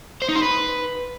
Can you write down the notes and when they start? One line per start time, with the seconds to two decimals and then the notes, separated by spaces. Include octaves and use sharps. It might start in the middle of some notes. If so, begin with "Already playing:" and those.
0.22 C5
0.29 D#4
0.36 C5
0.43 B4